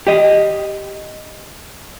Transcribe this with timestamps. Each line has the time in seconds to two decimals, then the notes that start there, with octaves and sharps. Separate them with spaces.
0.07 G4 D#5